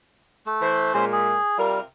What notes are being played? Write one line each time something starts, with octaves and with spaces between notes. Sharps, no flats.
A3
E3 C5
A#2 G#3 C#4 C5
G#4
C3 G3 F4 A#4